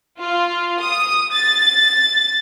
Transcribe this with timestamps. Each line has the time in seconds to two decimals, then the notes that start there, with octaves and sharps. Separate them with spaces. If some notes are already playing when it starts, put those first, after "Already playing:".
0.18 F4
0.79 D#6
1.33 A6